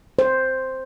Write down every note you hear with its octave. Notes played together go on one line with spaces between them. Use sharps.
C5